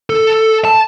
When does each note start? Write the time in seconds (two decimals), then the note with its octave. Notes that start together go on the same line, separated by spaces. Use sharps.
0.10 A4
0.65 A5